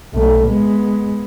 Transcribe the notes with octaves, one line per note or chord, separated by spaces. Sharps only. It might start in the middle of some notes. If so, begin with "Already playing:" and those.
B1 A3
G#3 B3